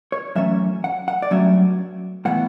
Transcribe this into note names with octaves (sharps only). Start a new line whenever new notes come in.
C#5
F#2 E3 A3 C#4 E5
F#5
F#5
D5
G2 F#3 A3 C#4 E5
A2 E3 B3 F#5